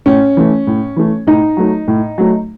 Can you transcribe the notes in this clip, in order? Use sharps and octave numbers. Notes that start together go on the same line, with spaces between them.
A2 C#4
E3 A3
A2
E3 A3
A2 D#4
F#3 A3
A2
F#3 A3